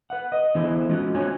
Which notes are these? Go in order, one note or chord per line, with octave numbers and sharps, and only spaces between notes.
B4 F#5
D#5
D3 E3 B3 E4 G#4 C5
G#3 C#4 F4 F#4
C4 D4 F#4 C#5 G#5